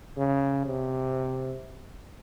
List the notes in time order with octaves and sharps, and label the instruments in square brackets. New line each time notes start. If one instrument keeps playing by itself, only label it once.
[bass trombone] C#3
C3